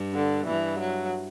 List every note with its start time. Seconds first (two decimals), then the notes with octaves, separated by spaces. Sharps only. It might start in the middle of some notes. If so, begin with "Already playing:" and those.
Already playing: G2
0.14 D3
0.47 G2 E3
0.79 F#3